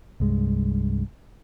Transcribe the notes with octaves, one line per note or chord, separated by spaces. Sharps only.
C2 G2 G#3